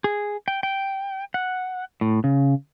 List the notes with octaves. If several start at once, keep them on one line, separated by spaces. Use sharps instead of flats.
G#4
G5
G5
F#5
A2
C#3